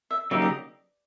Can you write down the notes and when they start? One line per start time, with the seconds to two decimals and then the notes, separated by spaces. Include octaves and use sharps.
0.11 E5
0.31 C#3 F#3 A#3 D#4 G4 E5
0.42 D#5